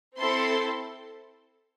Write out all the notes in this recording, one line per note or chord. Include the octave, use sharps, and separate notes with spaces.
C4 E4 A4 C6